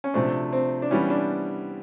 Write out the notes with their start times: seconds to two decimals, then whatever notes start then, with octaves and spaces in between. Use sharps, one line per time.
0.04 C#4
0.14 C3 F3 A3 C4 D4
0.53 C4
0.82 D4
0.91 E3 G3 B3 C#4
1.10 D4